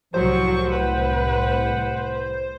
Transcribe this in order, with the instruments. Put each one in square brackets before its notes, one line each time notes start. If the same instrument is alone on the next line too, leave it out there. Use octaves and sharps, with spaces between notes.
[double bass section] C2 A2 [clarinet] F3 [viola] F#3 C#6 [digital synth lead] C5
[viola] B4 [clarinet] F#5